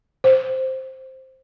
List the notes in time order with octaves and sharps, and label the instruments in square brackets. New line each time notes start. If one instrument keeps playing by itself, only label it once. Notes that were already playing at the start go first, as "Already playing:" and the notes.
[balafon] C5